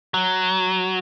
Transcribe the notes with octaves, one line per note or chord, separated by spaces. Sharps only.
F#3